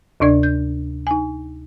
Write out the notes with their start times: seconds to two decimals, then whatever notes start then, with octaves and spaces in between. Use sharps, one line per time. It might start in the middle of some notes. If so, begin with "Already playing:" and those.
0.20 D2 C3 D4 D5 G#6
0.43 G6
1.07 D#4 G#5